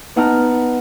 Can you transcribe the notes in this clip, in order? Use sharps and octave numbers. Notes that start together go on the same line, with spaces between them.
B3 D#4 F#5 A5 A#5 F6